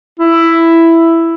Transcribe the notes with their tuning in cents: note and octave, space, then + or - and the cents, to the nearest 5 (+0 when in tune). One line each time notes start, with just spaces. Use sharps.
E4 +5